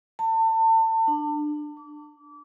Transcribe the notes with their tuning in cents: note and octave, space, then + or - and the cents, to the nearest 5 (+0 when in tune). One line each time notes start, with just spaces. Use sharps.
A5 +30
D4 +20
D6 -30